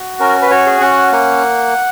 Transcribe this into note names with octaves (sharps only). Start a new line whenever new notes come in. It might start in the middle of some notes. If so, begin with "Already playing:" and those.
Already playing: F#4
C#4 A#4
B4
F#4 C#5
G#4
C#4 F#5
A#3 F#5